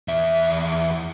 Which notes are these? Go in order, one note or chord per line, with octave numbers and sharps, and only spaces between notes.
E2 E5